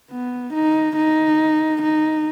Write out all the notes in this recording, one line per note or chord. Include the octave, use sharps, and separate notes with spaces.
B3
D#4
D#4
D#4